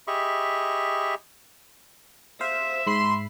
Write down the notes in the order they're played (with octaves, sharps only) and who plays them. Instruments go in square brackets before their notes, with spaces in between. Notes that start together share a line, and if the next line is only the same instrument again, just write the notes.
[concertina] G4 G#4 D#5 E5 B5 C#6
[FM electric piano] C5 F5 [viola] E5
[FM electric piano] G#2 B5 C7 [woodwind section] C6